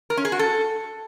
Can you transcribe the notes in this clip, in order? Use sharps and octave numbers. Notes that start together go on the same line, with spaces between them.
A#4
C#4
G#4
F#4
A4